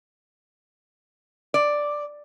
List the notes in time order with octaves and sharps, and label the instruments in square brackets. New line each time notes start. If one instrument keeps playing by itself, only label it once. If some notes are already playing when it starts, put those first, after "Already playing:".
[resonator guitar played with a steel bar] D5